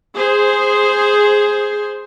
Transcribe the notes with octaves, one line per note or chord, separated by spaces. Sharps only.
G#4 C5